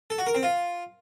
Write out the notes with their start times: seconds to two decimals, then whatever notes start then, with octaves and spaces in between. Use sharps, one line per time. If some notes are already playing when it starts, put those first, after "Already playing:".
0.10 A4
0.18 F#4
0.27 A#4
0.35 C4
0.43 F4